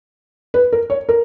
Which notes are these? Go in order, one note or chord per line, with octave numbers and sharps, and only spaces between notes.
B4
A#4
C#5
A#4